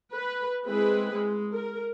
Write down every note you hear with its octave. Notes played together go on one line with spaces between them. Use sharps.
B4
G#3 C4 E4 G#4 B4
G#3
A#4